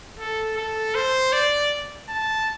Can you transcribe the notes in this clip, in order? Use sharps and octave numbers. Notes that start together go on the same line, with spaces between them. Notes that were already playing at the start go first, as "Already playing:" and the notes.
A4
A4
C5
D5
A5